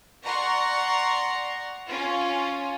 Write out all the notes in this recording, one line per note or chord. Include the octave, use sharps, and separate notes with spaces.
D5 F#5 A#5 C6 C#6
C#4 F4